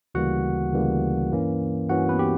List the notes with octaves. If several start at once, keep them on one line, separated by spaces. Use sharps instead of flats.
D2 C#3 E3 G3 A#3 F#4 F#5
D2 C#3 E3 G3 A#3
G2 E3 A#3 C#4
G2 E3 A#3 C#4 F#4 F#5
B3 B4
G4